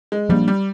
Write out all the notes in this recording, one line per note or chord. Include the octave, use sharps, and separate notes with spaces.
G#3
F3 G3 A#3 D4
G3